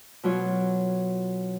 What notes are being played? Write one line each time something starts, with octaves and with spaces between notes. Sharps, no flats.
B2 F#3 F4 C#5